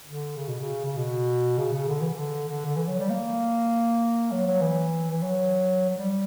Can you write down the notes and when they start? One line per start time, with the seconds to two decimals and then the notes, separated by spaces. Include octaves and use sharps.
0.06 D3
0.36 C#3
0.48 B2
0.61 C#3
0.86 C#3
0.97 B2
1.58 C#3
1.73 C#3
1.88 D3
2.01 E3
2.14 D3
2.48 D3
2.65 D3
2.76 E3
2.88 F#3
2.99 G3
3.10 A#3
4.32 F#3
4.46 F#3
4.62 E3
5.11 E3
5.23 F#3
5.89 F#3
5.98 G3